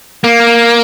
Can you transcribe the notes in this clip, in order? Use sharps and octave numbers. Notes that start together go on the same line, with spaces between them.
A#3